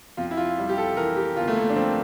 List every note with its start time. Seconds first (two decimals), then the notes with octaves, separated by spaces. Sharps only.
0.17 F2 F4
0.31 E4
0.37 F4
0.58 G3
0.69 G4
0.78 A4
0.97 E3 A#4
1.16 G4
1.36 G1 F4
1.48 A3
1.56 A#3
1.70 D4
1.76 F2 C4